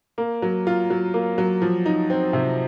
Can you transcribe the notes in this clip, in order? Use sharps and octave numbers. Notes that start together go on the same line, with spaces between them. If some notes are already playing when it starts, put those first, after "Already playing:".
A#3
F#3
F4
F#3
A#3
F#3
F3
D#4
C4
C3